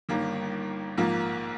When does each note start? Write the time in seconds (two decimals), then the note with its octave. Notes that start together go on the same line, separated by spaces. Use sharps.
0.09 G1 G2 D#3 A#3
0.98 A#1 G#2 F3 A#3